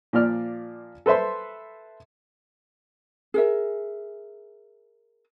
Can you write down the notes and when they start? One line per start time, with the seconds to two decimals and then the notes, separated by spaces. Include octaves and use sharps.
0.13 A#2 F3 D5 F6
1.06 A4 B4 C5 E5 C6
3.34 G#4 A#4 E5